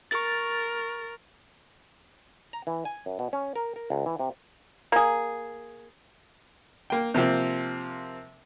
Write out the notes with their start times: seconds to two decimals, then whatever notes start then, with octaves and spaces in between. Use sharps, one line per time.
0.11 A#4 C#6 A6
2.53 A#5
2.67 E3
2.85 G#5
3.06 F#2
3.19 B2
3.33 C#4
3.55 A#4
3.76 A#4
3.90 C#2
4.06 E3
4.19 C3
4.92 A#3 G#4
6.90 A#3 G5
7.14 C3 F3 A#3 C4